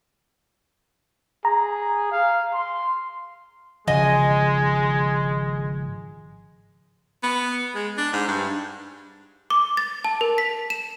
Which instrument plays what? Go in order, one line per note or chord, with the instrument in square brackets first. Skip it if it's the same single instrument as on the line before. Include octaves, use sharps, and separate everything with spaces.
[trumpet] G#4 [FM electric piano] A#5
[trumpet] F5
C6
[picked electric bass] G#1 C#3 F3 [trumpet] G#3 [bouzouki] D#5 G#5
[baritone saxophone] B3
G#3
D4
G#2
G2
[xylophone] D6
A6
A5
A#4
B6
E7